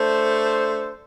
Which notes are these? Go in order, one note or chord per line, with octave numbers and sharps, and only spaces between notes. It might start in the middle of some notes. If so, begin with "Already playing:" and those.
Already playing: A3 D4 A4 C5